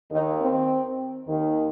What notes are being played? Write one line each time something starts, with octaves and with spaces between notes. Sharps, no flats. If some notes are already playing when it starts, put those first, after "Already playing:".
D#2 D#3 D#4
C4
D#2 D#3